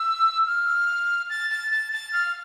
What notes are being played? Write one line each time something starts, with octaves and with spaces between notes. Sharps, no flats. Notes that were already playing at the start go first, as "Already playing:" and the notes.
Already playing: E6
F6
A6
A6
A6
A6
F6